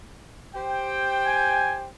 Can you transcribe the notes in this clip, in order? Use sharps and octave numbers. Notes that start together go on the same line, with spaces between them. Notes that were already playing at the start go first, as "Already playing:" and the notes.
G4 C5 G5
G#5